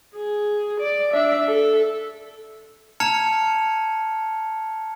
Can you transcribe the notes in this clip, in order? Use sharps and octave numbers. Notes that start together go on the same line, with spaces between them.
G#4
D5
D4 E5
A4
A5 A#5 F6 G#6 C#7 F7